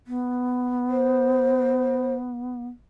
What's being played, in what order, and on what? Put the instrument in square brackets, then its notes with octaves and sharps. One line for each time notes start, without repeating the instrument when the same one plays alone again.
[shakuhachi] B3
[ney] C5